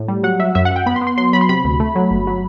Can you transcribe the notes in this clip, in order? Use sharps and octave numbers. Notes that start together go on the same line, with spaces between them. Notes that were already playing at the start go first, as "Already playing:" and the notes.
Already playing: A2
G3
F#3 F#5
F#3 E5
F#2 E5
F#5
F#2
G5
B3 B5
C6
B3
C6
F#3 C6
F#3 B5
C6
C3 B5
D2
A3
F#3
G1
F#3